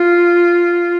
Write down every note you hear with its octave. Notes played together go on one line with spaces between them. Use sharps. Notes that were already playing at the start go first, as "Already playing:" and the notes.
Already playing: F4